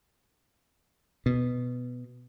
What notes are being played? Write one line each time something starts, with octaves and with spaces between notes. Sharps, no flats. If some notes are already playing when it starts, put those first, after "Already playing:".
B2